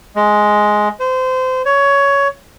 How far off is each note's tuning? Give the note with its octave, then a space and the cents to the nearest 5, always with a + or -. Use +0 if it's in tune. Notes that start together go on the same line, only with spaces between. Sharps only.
G#3 +10
C5 -25
C#5 +15